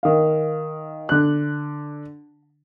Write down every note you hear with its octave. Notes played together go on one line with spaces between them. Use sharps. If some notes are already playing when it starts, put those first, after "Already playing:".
D#3 F5
D3 F#6